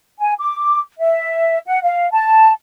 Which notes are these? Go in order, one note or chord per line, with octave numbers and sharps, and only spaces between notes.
G#5
D6
E5
F#5
F5
A5